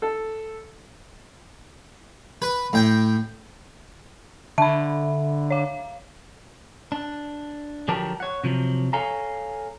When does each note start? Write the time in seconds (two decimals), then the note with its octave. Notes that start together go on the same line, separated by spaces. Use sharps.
0.02 A4
2.42 B4
2.73 A2 G5
4.58 D3 E5 A5 B5
5.50 C#5 F5
6.92 D4
7.88 D3 F3 F#3 G4 A#4 A5
8.20 C#5 F#5
8.44 C3 F3 F#3
8.93 A4 C#5 F5 G#5 A#5